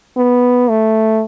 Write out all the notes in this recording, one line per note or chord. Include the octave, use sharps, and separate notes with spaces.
B3
A3